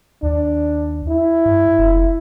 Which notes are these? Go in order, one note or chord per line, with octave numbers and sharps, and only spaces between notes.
D#2 D4
E4
G2
F1